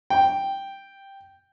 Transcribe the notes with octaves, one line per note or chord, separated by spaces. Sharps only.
G5